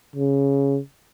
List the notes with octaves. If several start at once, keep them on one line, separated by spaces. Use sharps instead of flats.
C#3